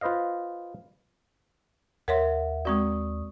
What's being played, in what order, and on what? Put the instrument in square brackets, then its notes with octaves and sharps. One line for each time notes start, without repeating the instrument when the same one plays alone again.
[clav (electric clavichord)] F4 B4 C5 D#5 F5
[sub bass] D#2 [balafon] A#4 C#5 C6 [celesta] E5 F#5
[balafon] G#3 C4 F#4 [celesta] D5 C#6 D#6